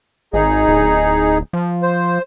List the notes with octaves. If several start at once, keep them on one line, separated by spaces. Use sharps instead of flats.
G#1 D#4 G#4
D1
F3
C5